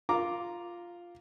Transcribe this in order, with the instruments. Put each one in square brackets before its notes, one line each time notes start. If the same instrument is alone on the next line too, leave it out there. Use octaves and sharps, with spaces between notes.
[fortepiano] F4 A#5 D6